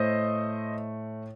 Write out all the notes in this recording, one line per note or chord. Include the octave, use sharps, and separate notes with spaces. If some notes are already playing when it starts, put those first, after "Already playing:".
Already playing: A2 A3 C5 D#5